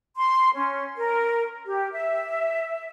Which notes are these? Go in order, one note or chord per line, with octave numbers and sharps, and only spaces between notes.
C6
C#4
A#4
G4
E5